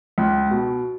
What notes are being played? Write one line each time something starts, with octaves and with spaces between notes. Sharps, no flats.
C#2
B2